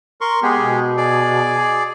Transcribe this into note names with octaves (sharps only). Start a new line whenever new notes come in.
A#4 C6 C#6
G#3 B3 G4 G#4
B2
G#4 D5